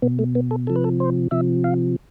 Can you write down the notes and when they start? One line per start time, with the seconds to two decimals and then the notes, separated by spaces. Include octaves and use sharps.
0.02 B2 B3
0.19 A3
0.35 B3
0.51 A4
0.67 C3 F3 A4
0.76 B4
0.84 A4
1.00 C5
1.31 C3 F3 E5
1.64 F5